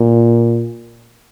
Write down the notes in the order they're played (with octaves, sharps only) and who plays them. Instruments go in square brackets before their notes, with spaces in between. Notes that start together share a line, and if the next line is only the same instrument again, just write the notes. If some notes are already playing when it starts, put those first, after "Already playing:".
Already playing: [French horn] A#2